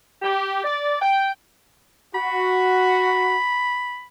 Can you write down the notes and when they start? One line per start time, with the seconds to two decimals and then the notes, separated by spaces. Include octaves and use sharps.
0.22 G4
0.63 D5
1.00 G5
2.15 F#4 B5